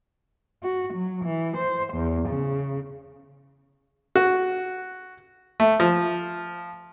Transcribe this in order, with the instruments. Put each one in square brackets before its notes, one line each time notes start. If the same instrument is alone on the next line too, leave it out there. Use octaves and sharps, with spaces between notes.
[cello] F#4
F#3
E3
C5
E2
C#3
[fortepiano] F#4
A3
F3